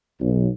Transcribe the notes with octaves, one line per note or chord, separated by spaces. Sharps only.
B1